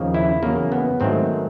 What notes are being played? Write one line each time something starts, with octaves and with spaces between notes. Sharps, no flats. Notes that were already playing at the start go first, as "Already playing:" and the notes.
Already playing: D#2 C#3 F3 A#3
E4
E2 C#3 F#3 A#3
B3
G#2 D#3 F#3 A3 C4